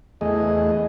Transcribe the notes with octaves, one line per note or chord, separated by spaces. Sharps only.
E2 A3 G#4 D#5